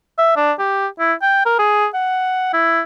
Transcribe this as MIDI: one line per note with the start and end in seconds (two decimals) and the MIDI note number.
0.18 0.33 76
0.36 0.53 62
0.59 0.87 67
1.00 1.14 64
1.22 1.42 79
1.46 1.57 70
1.59 1.88 68
1.94 2.49 78
2.53 2.82 64